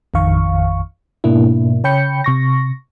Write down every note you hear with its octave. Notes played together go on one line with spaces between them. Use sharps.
A1 F2 D#3 F5 C#6
G#2 B2 A#3 D4 E4
C#3 C#5 G5 B5 G6 C#7
C3 C#6 A#6